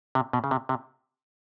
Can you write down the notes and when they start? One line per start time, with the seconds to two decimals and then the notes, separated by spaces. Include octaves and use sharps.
0.15 C3
0.33 B2
0.44 C#3
0.51 C3
0.69 C3